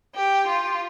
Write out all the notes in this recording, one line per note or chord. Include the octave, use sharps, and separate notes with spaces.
G4
F4